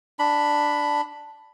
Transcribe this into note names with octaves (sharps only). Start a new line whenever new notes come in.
D4 B5